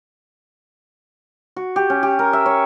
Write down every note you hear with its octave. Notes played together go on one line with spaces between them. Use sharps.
F#4
G4
C#4
G4
A#4
E5
C#5